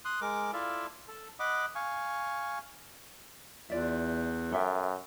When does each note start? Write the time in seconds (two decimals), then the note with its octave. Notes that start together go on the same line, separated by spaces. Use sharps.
0.05 C6 D#6 F#6
0.21 G#3 A#4 D6
0.53 E4 F4 A4 D5 E5 F5
1.08 A4
1.40 D#5 F#5 B5 D6
1.75 F5 G#5 C#6
3.70 E2 F4 D5 E5
4.52 F#2 A4 E5 G5